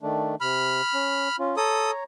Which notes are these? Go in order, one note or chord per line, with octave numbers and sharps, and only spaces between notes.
D#3 A3 D4
C3 B5 F6
C#4
C#4 F4
A4 C#5 A#5 D#6